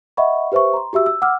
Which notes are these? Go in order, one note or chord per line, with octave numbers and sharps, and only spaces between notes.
D#5 E5 F#5 B5 C#6
G4 B4 C5 E5 C#6
A#5 C6
F#4 G4 E5 E6
E6
F#5 D6 E6 F6